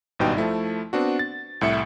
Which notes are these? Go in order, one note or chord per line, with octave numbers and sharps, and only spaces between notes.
G#1 G2 B2 D#4 G5
F3 A3 E4
B3 C4 D4 F#4
A6
C2 A2 E5 C#7